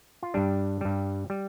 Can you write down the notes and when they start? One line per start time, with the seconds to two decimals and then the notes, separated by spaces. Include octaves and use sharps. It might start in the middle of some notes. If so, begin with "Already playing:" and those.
0.23 F4
0.34 G2 G3 D4
0.81 G2 G3
1.30 G3